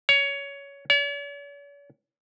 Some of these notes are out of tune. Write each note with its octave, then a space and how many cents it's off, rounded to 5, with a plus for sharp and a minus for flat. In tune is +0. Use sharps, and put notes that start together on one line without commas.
C#5 +15
C#5 +45